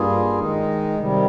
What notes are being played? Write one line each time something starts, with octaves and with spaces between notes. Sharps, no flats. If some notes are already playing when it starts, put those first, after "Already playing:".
Already playing: G2 G3 A#3 F4 G#4
D#3 G#3 D#4
C3 D#3 G3